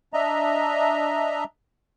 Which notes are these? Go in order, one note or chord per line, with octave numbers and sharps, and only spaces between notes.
D4 D#5 E5 A#5